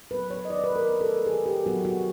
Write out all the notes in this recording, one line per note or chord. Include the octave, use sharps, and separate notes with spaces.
F#3 B3 B4
C#5
D#5
D#3 D5
B4
A#4
F#3 B3
A4
D#3 G#4
G4
F#3 B3 F#4
F#4